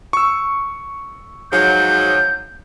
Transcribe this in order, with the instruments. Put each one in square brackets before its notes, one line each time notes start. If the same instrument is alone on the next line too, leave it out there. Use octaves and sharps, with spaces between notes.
[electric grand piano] C#6 E6
[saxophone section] G#2 F3 F#3 [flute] G6